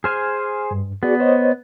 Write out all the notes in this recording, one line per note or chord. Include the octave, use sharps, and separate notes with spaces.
G#4 C5 G#5 F6
G2
B3 F#4 G#4 D5
C5 C#5 D#5